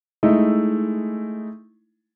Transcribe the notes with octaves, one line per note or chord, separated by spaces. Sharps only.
G#3 A3 D#4 E4